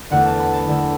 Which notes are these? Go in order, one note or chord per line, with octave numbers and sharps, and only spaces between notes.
E2 D3 A3 D4 F#5
A5
B5
A5
E2 D3 A3 D4 E6